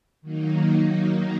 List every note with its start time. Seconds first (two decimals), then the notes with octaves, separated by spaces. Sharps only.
0.21 D#3 F#3 A#3 D#4